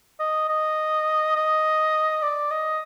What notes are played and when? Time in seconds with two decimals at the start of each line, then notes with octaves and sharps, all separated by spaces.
0.20 D#5
0.48 D#5
1.36 D#5
2.22 D5
2.51 D#5